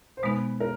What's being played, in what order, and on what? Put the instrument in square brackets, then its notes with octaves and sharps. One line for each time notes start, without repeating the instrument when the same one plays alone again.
[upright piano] C5
[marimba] B2 G#3 B3 D#4 [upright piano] B4
[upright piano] A#4